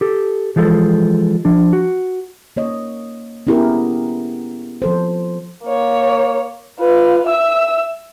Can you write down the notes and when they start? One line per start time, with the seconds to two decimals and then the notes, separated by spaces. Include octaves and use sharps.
0.01 G4 A4
0.56 E3 F3 G#3 A4
1.45 F3 D4
1.73 F#4
2.56 A#3 C#5 D#5
3.47 B3 C#4 E4 G4 G#4 A#4
4.82 F3 A4 C5
5.64 A#3 C#5
6.79 F4 B4
7.26 E5 E6